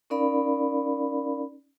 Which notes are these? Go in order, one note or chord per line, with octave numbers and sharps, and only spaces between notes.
C#4 D#4 A#4 D5 F5 B5